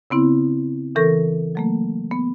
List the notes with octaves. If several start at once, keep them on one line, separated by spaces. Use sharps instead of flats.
C#3 B3 C4 E4
C#3 E3 A4 A#4 C#6 A#6
F#3 A3 A#3
B3